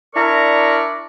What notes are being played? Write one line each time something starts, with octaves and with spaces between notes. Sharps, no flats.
D4 E4 A#4 D5 A#5 C#6